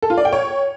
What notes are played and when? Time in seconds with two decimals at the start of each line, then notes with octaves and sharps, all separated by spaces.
0.02 A4
0.10 F4
0.18 D5
0.25 G5
0.33 C#5